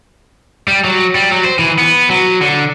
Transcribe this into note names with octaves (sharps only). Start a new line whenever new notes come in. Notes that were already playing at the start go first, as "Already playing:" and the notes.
G3
F#3
G3
F#3
C5
E3
B3
F#3
D3